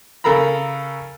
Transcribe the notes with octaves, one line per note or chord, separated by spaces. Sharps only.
C#3 A4 A#4 A#5 B5